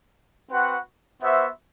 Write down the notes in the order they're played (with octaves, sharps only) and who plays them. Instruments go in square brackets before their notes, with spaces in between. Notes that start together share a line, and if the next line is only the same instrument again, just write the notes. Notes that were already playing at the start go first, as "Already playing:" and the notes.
[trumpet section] C4 F#4 B4 F#5
B3 F#4 C5 E5